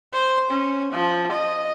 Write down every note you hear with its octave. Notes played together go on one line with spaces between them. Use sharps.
C5
C#4
F3
D#5